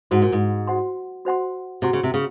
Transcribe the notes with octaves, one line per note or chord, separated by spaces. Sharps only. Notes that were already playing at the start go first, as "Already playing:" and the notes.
G#2 F#4 C5 F#5 C6
A#2
G#2
F#4 C5 F#5 C6
F#4 C5 F#5 C6
C3 F#4 C5 F#5 C6
C#3
C3
C#3